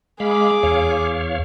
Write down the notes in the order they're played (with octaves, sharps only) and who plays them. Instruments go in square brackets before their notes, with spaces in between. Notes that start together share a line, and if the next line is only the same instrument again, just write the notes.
[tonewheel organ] G#3 F5 B5 [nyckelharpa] G#4 D6
[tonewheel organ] E2 C#5 F5